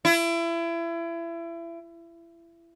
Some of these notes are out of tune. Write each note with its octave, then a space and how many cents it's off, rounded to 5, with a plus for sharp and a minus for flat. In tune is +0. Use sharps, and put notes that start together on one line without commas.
E4 +30